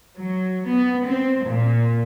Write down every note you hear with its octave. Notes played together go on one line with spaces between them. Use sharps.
F#3
B3
C4
A#2